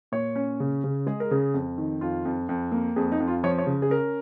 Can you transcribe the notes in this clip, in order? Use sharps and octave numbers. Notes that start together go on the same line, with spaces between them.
A#2 C#5
C#4
C#3
C#3
G#3 G#4
A#4
C#3 G#4
F2
D#3
F2 F4
F2
F2
A#3
F2 G#4
D#4
F2
F4
F3 C#5
C#5
C#3
G#4
C#4 A#4